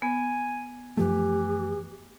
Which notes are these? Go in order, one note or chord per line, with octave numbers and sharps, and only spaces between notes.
B3 G#5
F#2 E3 F3 A3 G4